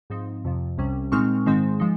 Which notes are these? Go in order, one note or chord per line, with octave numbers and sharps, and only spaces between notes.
G#2 F3 C4 D#4
F2 C3 F3
C2 C3 G3 C#4
A#2 G#3 C4 D#4 C#6 F6
G#2 D#3 G#3 C4 D#4
F3 G#3 D#4